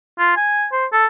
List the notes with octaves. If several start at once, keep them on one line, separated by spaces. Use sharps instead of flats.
F4
G#5
C5
A4